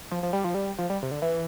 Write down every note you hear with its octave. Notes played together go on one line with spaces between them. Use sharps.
F3
F3
G3
F3
G3
F3
G3
C3
D3
E3